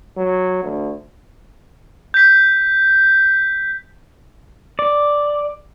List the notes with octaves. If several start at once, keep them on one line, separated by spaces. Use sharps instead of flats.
F#3
D2
G6 B6
D5